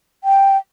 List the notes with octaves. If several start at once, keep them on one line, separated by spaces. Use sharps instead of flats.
G5